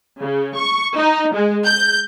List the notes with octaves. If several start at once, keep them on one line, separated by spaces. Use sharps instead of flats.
C#3
C#6
D#4
G#3
G6